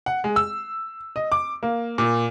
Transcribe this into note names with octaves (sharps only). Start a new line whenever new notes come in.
F#5
G#3
E6
D#5
D6
A#3
A#2